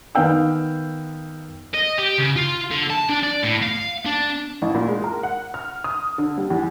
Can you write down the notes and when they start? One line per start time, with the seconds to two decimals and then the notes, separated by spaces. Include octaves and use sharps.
0.15 D#3 B3 F5 G5 E6
1.74 D#5
1.98 G4
2.18 C#3
2.36 F4
2.71 D3
2.90 A5
3.09 D4
3.23 D5
3.43 A2
3.63 F5
4.05 D4
4.62 A1
4.74 A#2
4.88 G#3
5.04 A#4
5.23 F#5
5.54 F6
5.84 D#6
6.18 D3
6.38 G3
6.50 E2